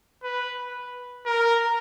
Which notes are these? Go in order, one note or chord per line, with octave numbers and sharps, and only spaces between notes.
B4
A#4